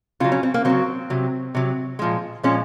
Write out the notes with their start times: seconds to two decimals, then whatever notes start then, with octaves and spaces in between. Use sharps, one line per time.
0.20 C#3 F4
0.24 F#3
0.32 C#4
0.43 C4
0.54 A#3
0.65 C#3 F#3 C4
1.10 C3 F#3
1.55 C3 F#3
1.99 A#2 F3 G#3
2.44 A#2 F3 G#3 C#4